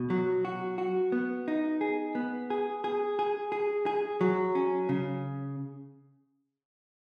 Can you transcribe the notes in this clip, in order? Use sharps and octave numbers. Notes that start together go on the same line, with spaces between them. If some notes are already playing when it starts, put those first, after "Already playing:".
Already playing: B2
F#3
F#4
F#4
B3
D#4
G#4
B3
G#4
G#4
G#4
G#4
G#4
F#3
C#4
C#3